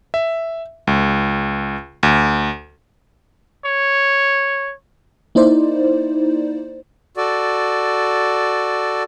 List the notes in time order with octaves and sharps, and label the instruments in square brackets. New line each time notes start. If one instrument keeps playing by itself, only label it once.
[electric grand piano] E5
C#2
D2
[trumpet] C#5
[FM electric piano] A#3 D#4 E4 C5 D5
[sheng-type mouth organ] F#4 A4 D5